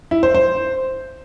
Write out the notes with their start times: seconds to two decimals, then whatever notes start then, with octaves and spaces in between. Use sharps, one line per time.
0.11 E4
0.23 C5
0.35 C5